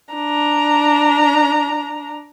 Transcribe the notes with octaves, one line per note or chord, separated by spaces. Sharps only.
D4 A#5